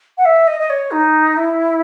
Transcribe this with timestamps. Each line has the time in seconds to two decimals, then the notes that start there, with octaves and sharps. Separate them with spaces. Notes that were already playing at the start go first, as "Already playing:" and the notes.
0.18 F#5
0.25 E5
0.47 D#5
0.60 D#5
0.70 C#5
0.91 D#4
1.36 E4